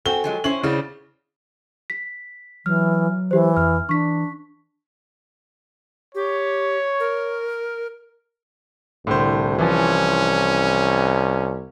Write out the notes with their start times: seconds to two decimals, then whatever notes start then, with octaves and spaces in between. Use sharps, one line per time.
0.06 C4 F#4 A4 G5 G#5 G7
0.24 F3 F#3 G#3
0.44 C#4 E4 C5 F#7
0.63 C#3 B3 C#4 E4 C5 D5
1.90 B6
2.66 E3 F#3 F6
3.31 E3 G4 C5
3.57 F2 F6
3.89 E3 D4 C#6 B6
6.15 G4 C#5
7.00 A#4
9.07 C2 A2 D3 C5
9.59 E3 F3 C#4